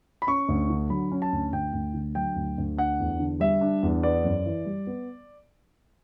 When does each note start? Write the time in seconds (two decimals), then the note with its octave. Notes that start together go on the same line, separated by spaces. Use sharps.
0.22 B5
0.27 C#4 C#6
0.48 D2
0.70 D3
0.90 F#3 B5
1.12 C#4
1.22 A5
1.32 D2
1.52 D2 G5
1.73 D2
1.94 D3
2.15 F#3 G5
2.36 D2
2.58 D2
2.77 D4 F#5
2.99 E2
3.19 D3
3.40 G3 E5
3.61 D4
3.83 E2
4.03 B3 D5
4.24 F#2
4.46 E3
4.65 G3
4.87 B3